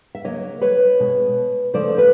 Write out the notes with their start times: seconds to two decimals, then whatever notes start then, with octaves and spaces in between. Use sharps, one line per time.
0.15 E5
0.25 C#3 F#3 A#3 C#5 D#5
0.61 B4 C#5
1.00 B2 G#3
1.74 C#3 F3 A3 C5 D5
1.98 B4